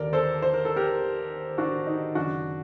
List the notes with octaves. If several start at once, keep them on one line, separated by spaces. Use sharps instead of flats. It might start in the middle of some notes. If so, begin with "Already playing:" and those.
Already playing: D#2 D3 A#4 D5
A4 C5
C5
A#4
A4
G4 A#4
D4 F#4
D#4
F#1 F#2 D#3 D4 F#4